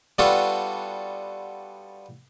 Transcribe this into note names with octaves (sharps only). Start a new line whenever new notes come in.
G3 B3 D4 F4 F#4 A4